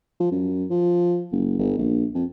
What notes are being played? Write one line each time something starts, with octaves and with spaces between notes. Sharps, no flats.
F3
F#2
F3
F#1
G1
A#1
F2